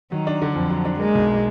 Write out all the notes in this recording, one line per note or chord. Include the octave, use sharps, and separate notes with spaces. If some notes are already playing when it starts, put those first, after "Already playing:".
D#3 F#3
D4
D3
F2 F3
F#3
D4
G#3 A#3
B1
B2